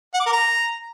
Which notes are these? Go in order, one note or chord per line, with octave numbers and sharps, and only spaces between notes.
F#5
D6
A#4
A#5